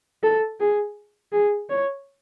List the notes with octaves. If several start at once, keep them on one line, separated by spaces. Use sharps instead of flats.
A4
G#4
G#4
C#5